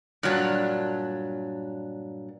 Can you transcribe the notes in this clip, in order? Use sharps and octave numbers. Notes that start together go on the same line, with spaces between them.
G2 A#2 F#3 D4